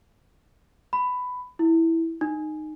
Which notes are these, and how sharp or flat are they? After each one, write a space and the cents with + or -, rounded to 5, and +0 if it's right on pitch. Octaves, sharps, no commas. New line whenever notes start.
B5 +15
E4 -5
D#4 -15